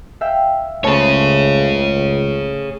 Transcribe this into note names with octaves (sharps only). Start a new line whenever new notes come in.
E5 F5 G5
C#2 A2 G#4 C5 C#5 A5